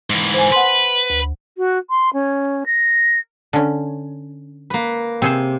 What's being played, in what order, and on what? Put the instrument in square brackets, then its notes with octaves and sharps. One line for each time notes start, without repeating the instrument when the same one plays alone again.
[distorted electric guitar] G#2 E3
[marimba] C5 G#5
[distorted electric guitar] B4 [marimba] F#5 C6
[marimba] D2
[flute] F#4
C6
C#4
A#6
[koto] D3 C#4
[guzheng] A#3 B4
[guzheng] C3 [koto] C4 G#4 C5